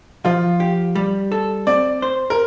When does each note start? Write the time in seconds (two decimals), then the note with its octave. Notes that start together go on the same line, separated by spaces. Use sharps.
0.25 F3 F4
0.60 G4
0.95 G3
1.32 A4
1.67 C4 D5
2.02 C5
2.30 A#4